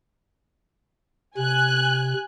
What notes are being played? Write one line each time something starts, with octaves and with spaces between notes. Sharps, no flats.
C3 G#5 F#6